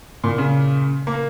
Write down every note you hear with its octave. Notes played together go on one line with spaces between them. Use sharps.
A#2
C#3
A#3